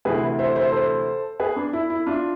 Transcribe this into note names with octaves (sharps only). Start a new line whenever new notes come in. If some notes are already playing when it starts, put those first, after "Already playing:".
D2 C3 E3 G#4 B4
C5 E5
C5 E5
A4 C5
G#4 B4
D4
E4
E4
D4 F4